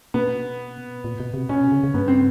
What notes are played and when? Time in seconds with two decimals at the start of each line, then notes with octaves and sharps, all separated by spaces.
0.14 B2 B3
1.04 A#2
1.20 B2
1.34 C3
1.49 B2 C#4
1.72 C#3
1.83 C#3
1.94 G2 B3
2.08 C4